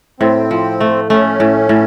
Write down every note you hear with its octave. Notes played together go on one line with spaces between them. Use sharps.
A2 C4
F3
A3
A3 C#4
A2
A2